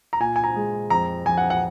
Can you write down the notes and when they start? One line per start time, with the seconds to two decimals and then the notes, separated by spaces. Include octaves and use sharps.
0.13 A#5
0.20 A#2 G#5
0.36 G#5
0.44 A#5
0.56 G#3
0.90 F2 A#5
1.25 F2 G#5
1.38 F#5
1.50 F#5